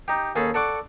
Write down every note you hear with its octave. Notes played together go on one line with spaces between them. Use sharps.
D#4 G4
D#2 C#4 G#4 A4 A5 B5
A4 D5 F#5 C#6 D6